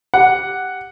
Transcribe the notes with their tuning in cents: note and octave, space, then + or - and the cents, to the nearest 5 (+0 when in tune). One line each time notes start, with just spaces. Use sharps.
G4 +0 F#5 +0